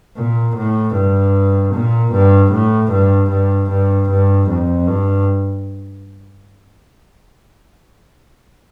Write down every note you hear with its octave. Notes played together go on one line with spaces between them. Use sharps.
A#2
A2
G2
A#2
G2
A2
G2
G2
G2
G2
F2
G2